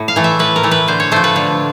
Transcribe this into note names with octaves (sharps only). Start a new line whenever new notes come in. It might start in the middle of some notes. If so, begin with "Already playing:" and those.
Already playing: A2
F5
E3 A3
E5
A2 B4
A#4
E3 A3
B4
D3 C5
C#5
F3 A3 C5
B4
D3